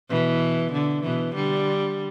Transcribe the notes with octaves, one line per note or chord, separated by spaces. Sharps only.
B2 E3
D3
B2 E3
D3 G3